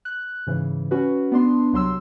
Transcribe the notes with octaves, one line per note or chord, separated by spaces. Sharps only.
F#6
G#2 C#3 E3
C#4 F#4 B4
B3 D4 C6
C2 F#3 C6 E6